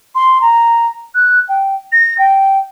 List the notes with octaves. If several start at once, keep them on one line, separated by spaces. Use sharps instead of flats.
C6
A#5
F#6
G5
A#6
G5